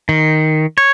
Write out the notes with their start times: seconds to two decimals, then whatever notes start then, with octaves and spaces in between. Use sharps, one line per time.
0.09 D#3
0.78 C#5